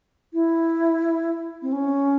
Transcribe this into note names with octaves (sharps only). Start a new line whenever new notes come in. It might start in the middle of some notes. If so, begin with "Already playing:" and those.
E4
C4
C#4